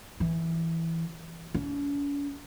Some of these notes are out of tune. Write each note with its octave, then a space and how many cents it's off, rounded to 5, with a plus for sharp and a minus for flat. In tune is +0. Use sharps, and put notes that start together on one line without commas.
E3 +0
C#4 +45